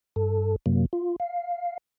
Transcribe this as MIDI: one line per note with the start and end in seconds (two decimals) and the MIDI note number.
0.16 0.56 43
0.16 0.56 69
0.66 0.86 42
0.66 0.86 48
0.66 0.86 54
0.66 0.86 58
0.93 1.16 65
1.20 1.78 77